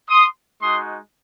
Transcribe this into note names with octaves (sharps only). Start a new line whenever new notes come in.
C6 D#6
G#3 D#4 F#4 C6 D#6